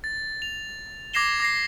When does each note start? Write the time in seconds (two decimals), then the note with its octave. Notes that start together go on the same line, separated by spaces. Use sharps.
0.04 A6
0.42 F7
1.14 D6 G#6 A#6 C7 E7 G7
1.40 D6 A#6 C7